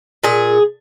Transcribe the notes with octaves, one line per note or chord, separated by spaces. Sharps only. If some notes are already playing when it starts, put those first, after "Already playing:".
A#2 G#4